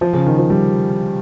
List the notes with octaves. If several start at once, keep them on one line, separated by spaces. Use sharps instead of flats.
F3
C#3
D#3
F3
G3